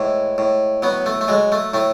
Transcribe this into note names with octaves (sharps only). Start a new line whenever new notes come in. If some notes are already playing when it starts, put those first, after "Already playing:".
Already playing: A2 E3 G#3
A2
F#3 B3
A3
A3
F#3 G#3
A3
A2 A3